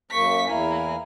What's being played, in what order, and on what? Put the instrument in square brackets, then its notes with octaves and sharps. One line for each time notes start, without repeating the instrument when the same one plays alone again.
[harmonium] F#2 A#3 [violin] C#6 B6
[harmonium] E2 E4 G#5 [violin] A#3